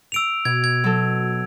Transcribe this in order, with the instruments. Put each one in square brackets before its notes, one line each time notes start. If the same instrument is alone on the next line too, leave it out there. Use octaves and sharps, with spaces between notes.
[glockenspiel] E6 D7 F7
[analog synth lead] B2 [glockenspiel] G#6
[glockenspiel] G#6
[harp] F#3 A4